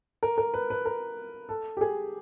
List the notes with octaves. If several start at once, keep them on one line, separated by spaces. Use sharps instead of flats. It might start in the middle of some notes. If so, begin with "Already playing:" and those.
A#4
A#4
B4
B4
A#4
A4
G4
G#4